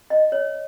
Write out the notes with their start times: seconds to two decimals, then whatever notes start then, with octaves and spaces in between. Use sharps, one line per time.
0.10 D#5
0.32 C#5